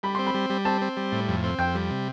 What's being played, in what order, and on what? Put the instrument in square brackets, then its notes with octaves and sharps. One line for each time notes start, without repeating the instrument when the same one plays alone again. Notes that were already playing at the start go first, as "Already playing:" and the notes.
[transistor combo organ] G3 [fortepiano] B5
[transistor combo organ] C4 [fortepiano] C6
[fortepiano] B5
[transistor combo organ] G3
G3
[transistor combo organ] C4 [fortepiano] A5
[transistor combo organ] C4
G3
A2
F2
C4
[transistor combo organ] F2 [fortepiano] G5
[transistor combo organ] G3
C3